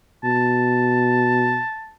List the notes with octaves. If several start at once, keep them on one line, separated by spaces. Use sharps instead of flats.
B2 A5